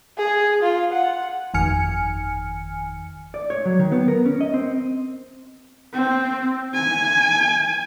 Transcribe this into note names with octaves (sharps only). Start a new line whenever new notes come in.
G#4
F4
F#5
G1 F2 D#3 G#5 F6 C#7
D5
C#5
F#3
D#3
B3
A#4
C#4
D#5
C4
C4
G#5